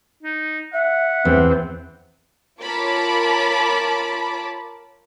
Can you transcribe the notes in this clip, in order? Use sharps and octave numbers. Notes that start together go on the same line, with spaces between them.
D#4
E5 F#5
E2 C4
F4 A#4 C#5 A5 B5 D6